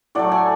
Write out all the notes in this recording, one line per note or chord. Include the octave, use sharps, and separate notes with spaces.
A2 F#3 A3 D5 F#5
E5 G#5